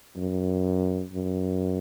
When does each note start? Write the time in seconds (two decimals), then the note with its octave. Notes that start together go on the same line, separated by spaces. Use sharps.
0.17 F#2
1.13 F#2